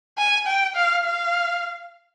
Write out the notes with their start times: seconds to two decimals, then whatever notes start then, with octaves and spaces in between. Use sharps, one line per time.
0.18 G#5
0.47 G5
0.75 F5
1.03 F5